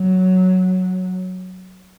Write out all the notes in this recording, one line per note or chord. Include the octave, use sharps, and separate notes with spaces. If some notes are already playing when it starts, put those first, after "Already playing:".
Already playing: F#3